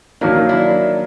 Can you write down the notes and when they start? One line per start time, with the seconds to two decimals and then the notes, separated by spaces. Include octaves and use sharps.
0.21 D#3 F#3 A#3 D4 E4
0.49 D4 E4